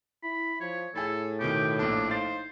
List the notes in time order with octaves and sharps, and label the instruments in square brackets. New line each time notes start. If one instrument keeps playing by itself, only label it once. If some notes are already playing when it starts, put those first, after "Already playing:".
[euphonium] E4 [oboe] B5
[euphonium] F3 [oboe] C#5
[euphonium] A2 [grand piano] E4 G#4 [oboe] A4
[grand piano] B2 D#3 [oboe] G4
[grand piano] A#1 A#2 A4 [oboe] D4
[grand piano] D#4 F5 A6 [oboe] C5